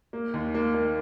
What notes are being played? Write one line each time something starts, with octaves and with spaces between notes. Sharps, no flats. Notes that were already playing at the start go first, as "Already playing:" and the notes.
A#3
D#2
A#3
A#3